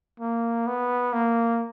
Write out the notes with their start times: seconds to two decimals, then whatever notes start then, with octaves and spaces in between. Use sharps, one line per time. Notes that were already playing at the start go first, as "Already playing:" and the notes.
0.20 A#3
0.67 B3
1.13 A#3